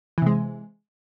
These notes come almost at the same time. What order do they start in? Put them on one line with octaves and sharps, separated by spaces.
E3 C3 G#3